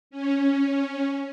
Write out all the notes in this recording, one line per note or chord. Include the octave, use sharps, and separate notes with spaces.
C#4